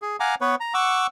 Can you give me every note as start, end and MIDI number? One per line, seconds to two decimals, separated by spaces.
0.02 0.17 68
0.20 0.35 77
0.20 0.35 78
0.20 0.35 80
0.20 0.35 82
0.20 0.35 86
0.41 0.55 59
0.41 0.55 71
0.41 0.55 73
0.60 0.74 82
0.74 1.07 78
0.74 1.07 85
0.74 1.07 86
0.74 1.07 88